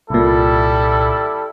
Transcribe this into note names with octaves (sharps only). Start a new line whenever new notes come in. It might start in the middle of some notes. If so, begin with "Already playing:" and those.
C2 A#2 G3 E4 A4